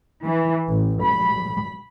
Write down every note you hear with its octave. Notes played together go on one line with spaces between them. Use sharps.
E3
A1
B5